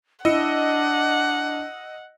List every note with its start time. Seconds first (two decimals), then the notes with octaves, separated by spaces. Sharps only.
0.25 D4 E4 D#5 F#5 E6 C#7